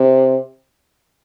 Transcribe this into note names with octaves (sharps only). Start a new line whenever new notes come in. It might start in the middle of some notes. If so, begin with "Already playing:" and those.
Already playing: C3